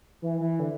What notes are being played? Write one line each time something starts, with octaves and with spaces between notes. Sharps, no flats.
E3
E3
D3